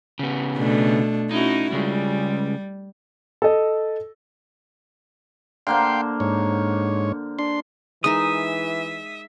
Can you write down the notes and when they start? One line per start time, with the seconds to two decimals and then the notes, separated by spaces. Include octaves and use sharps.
0.19 C#3 B3
0.57 B2 A3 D4
1.31 C#4 D#4 E4 F#4
1.73 C#3 G3 G#3
3.42 A4 D#5
5.67 D3 A#3 C5 F5 G5 C6
6.20 G#2 C#5
7.39 D4 C6
8.04 E3 G#3 D#4 A#4 E5 D#6